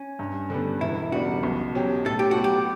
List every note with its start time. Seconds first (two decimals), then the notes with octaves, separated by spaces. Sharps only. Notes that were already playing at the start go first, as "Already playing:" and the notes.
Already playing: C#4
0.19 G2
0.50 D3 G3 B3
0.81 E1 E4
1.12 E2 C#3 G3 D4 F#4
1.43 B1
1.75 B2 F#3 C#4 G4
2.05 A2 A4
2.19 G4
2.31 F#4
2.37 F#3 B3
2.44 G4